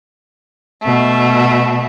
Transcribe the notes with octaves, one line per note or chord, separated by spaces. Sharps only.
B2 A3